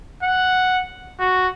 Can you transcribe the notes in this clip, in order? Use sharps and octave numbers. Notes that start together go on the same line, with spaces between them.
F#5
F#4